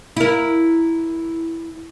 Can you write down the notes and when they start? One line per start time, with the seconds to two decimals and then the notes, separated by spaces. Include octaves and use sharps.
0.17 E4 A#4